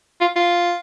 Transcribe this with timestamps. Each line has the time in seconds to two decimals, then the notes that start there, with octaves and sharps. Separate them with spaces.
0.21 F4
0.36 F4